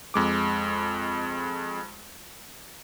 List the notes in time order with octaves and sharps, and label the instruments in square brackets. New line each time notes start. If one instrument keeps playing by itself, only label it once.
[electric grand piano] F2 G#3 D6